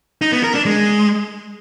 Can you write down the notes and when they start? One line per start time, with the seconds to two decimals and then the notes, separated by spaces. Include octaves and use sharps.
0.21 D#4
0.32 B3
0.43 A#4
0.54 D4
0.65 G#3